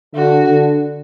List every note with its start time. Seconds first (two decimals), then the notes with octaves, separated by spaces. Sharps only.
0.15 D3 F#4
0.48 D3